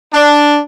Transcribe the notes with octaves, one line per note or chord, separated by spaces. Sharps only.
D4